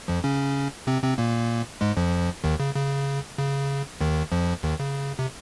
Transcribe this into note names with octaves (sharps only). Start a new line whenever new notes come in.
F2 F3
C#3 C#4
C3 C4
C3 C4
A#2 A#3
G#2 G#3
F2 F3
D#2 D#3
C#3
C#3
C#3
D#2 D#3
F2 F3
D#2 D#3
C#3
C3